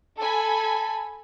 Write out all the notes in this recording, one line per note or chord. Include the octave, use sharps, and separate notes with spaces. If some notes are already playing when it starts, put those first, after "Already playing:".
A4 G#5 A5 B5